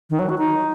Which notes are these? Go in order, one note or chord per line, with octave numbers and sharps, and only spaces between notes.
D#3
F#3
F#4
D#4